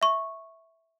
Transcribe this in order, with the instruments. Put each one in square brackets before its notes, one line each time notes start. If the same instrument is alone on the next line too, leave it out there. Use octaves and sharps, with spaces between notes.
[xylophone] E5 C#6